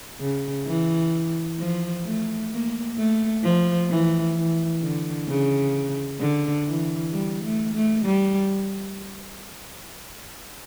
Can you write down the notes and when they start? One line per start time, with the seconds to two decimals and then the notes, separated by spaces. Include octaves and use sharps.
0.20 C#3
0.67 E3
1.59 F3
2.05 A3
2.52 A#3
2.98 A3
3.44 F3
3.90 E3
4.36 E3
4.83 D3
5.29 C#3
6.20 D3
6.67 E3
7.13 G3
7.44 A3
7.75 A3
8.06 G3